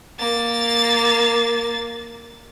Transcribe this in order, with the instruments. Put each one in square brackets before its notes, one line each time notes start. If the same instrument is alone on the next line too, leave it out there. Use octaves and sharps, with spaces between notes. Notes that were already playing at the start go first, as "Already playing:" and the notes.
[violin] A#3 A6